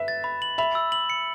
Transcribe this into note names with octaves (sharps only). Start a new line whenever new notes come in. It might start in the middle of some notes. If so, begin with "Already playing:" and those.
Already playing: B4 E5
A6
B5
F#7
E5 B5
E6
F#7
C#7